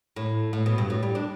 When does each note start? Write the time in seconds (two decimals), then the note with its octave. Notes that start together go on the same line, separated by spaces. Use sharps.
0.16 A2
0.53 A2
0.66 B2
0.78 G2
0.90 A2
1.03 G3
1.15 D4